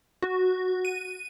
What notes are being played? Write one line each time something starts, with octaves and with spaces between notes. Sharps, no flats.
F#4
D#7